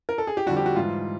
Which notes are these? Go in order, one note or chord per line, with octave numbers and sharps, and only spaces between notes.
A#4
A4
G#4
G4
F2 D3 G3 F#4
G4
F#4
G#2 E3 G3 F4